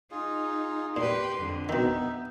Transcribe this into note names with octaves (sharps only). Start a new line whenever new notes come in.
D#4 F4 G#4
A#2 G4 B4 C6
F2 D3
B2 D#3 B3 D#4 E5